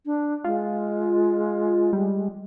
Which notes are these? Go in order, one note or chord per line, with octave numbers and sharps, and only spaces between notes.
D4
G#3 F4
G3